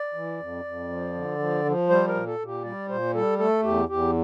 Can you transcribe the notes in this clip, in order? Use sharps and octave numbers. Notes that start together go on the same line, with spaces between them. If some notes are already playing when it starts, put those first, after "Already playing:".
Already playing: D5
E3
F2
F2
F3
D3
F3
F3
G3 C5
A#4
A#2
A4
A#2
G4
G3 D5
A#2 C5
G3 A4
A3 A4
E2 G4
E2 G4